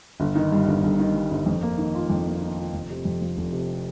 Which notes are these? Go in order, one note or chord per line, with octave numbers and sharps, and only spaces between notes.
G1
D#3
G2
G1
G1
D#3
G2
G1
F2
A#3
D#3
F4
F2
A#3
D#3
F4
F1
C3
F2
F3
F1
C3